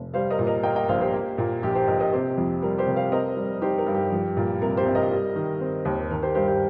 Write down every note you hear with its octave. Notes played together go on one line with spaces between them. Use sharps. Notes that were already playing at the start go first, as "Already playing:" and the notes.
Already playing: F1
G3 C5 F5
A#4 D#5
A#2
A#4 D#5
A#3 D#5 G5
D#5 G5
A#1 C5 F5
G4 C5
A#3
A#2
A#1 G4
G4 C5
A#1 A#4 D#5
A#4 D#5
C3 G4 C5
F2
G3 A#4
G4 C5
F1
C5 F5
C4 A#4 D#5
G3
D#4 G4 C5
A#4
G2
G4
F3
A#2
C2 A#4
G4 C5
C2
A#4 D#5
G3
D#3
C4
D#2
D#3 A#4
G4 C5
G2 G4 C5
G4 C5